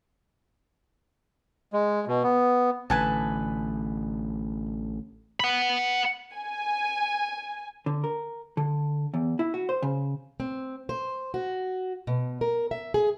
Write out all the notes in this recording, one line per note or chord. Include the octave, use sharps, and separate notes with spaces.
G#3
B2
B3
A1 D3 B4 G#5 A5
F#5 B5
G#5
D3
A#4
D3
E2
E4
F#4
C5
C#3
C4
C5
F#4
B2
A#4
E5
G#4